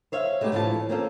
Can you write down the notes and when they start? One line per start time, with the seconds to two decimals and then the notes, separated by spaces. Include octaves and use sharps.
0.12 C5 C#5 E5 F5
0.41 G#3 A3 B3 D#4 G4
0.52 D2 A2 E3 F3 F4 A5
0.89 A#3 C4 C#4 F4 G4 A4